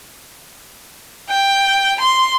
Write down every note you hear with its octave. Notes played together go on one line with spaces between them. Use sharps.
G5
C6